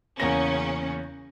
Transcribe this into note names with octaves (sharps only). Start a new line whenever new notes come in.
E2 C#3 A#3 C#4 A#6